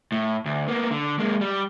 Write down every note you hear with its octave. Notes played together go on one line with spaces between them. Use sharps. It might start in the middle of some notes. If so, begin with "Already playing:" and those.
A2
D2
A#3 B3
D3
G#3 A#3
G3